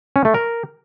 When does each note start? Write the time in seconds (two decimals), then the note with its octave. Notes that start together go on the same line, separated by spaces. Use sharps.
0.16 C#4
0.25 A3
0.34 A#4